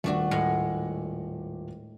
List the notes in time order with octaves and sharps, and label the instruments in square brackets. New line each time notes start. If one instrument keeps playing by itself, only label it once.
[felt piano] D#1 D5 [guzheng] A3 D4 F#4
[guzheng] A2 G#3 F#5